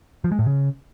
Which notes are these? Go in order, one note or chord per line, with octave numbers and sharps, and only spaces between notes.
F3
G#3
A2
C#3